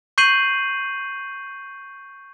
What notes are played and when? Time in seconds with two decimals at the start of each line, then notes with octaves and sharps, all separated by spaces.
0.18 C#6 G6 C7 D#7 F#7